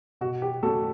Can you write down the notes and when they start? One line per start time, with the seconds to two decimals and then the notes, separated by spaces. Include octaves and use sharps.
0.21 B2 F#4
0.42 G4
0.63 A3 F#4 A4
0.66 C#4